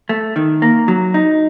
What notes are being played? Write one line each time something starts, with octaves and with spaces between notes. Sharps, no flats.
A3
D#3
A#3
F#3
D#4